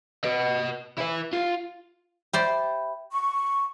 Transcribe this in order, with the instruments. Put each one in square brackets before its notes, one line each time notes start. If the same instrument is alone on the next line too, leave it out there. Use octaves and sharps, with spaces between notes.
[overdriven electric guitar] B4 D#5
E4 B4
F4
[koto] G4 C5 D5 [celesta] E5 B5
[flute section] C#6